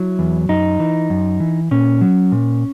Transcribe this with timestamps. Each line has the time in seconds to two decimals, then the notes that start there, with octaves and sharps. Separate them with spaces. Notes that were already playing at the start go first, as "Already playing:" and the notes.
Already playing: F#3 E4
0.19 E2
0.49 F#2 D#4
0.80 E3
1.10 F#2
1.40 E3
1.71 A#2 C#4
2.01 F#3
2.32 A#2